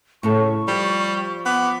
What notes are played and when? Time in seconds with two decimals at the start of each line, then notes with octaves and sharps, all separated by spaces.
0.23 A2 C#3 A4 C#6
0.68 F3 G3
1.46 B3 D6